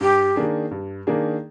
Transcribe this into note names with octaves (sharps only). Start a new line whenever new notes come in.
G2 G4
D#3 A#3 D4 G#4
G2
D#3 A#3 D4 G#4